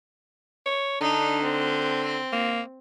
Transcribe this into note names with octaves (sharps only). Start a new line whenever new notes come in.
C#5
D3 D4 D#4
C4
A#3